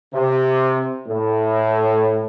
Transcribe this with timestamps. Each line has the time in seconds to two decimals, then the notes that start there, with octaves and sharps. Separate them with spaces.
0.13 C3
1.06 A2